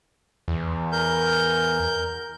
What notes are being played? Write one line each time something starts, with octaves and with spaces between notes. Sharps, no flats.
E2
A#4 G6